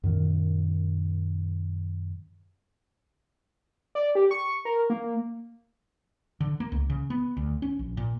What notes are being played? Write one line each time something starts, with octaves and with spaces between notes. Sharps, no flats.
F#2 A#2 D#3
D5
G4
C#6
A#4
A#3
D3
A#3
C#2
C#3
B3
D2
C#4
A#1
A#2